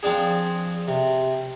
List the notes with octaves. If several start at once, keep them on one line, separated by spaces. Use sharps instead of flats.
F3 C4 D4 G#4
C3